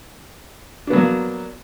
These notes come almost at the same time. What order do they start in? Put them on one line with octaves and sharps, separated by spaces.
D4 B3 F#3 A#3